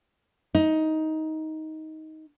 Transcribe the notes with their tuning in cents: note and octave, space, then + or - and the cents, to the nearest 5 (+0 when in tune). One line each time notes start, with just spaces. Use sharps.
D#4 +15